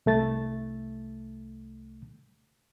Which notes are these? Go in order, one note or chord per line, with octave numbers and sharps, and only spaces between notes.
C2 A3 A6